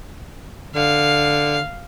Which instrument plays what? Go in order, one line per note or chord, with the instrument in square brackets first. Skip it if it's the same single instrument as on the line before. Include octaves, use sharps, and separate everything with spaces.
[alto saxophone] D3 [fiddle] F5